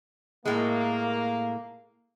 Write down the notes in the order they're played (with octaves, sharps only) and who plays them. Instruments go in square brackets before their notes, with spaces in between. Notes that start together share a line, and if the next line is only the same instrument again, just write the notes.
[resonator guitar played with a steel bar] A2 G#3 [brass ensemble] A#3